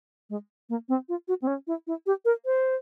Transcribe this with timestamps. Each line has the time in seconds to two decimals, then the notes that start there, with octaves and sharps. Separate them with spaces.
0.30 G#3
0.69 A#3
0.89 C4
1.09 F4
1.28 F#4
1.42 C4
1.47 C#4
1.67 E4
1.87 E4
2.06 G4
2.25 A#4
2.45 C5